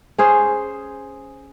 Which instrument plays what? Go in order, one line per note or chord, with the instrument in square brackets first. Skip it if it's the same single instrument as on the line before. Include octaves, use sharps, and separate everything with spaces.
[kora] C#4 G#4 C5